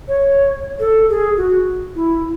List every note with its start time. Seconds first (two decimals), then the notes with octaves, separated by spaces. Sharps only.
0.08 C#5
0.80 A4
1.09 G#4
1.37 F#4
1.95 E4